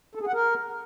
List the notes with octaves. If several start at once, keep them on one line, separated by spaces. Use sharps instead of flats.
A4
G#4
F#5
A#4